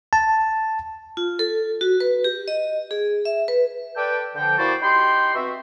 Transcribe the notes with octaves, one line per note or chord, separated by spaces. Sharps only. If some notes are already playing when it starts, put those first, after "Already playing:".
A5
F4
A4
F#4
B4
G4
D#5
G#4
E5
B4
A4 B4 D5 G5
D3 F3 G5
A#3 E4 F#4 C5 D5 A5
D#4 G4 G5 B5 C6
B2 C4 F#4 E5